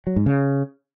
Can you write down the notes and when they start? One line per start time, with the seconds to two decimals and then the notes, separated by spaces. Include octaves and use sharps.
0.07 F#3
0.16 G#2
0.26 C#3